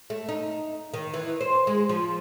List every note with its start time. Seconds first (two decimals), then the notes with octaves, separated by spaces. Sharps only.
0.10 A3
0.29 D#4
0.94 D#3
1.14 E3
1.41 C5
1.67 G#3
1.89 F3